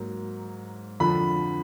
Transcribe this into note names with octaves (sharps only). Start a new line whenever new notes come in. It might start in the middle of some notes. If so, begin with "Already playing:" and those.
Already playing: G#2 F#3 A#3
F2 D3 F3 B5